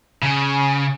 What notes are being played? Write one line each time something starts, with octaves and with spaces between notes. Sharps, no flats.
C#3